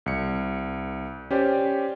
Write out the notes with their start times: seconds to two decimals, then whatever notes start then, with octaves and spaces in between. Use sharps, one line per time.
0.06 C2 C#7
1.31 C#4 G4 C5 D5